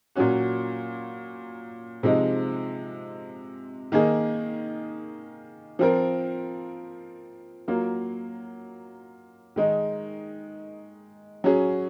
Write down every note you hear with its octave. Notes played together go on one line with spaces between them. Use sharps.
A#2 F#3 C#4 F#4
C3 F3 G#3 D#4
D#3 A#3 D#4 G#4
F3 C4 F4 A#4
F#3 A#3 F4
D#3 G#3 D#4
F#3 C#4 G#4